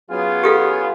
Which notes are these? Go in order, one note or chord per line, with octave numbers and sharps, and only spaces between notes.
F#3 B3 C#4 F4 G#4 G#5
G4 A4 F5